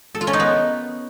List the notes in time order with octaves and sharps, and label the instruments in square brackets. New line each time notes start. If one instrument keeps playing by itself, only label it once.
[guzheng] A4
F4
C#4
D#4
B3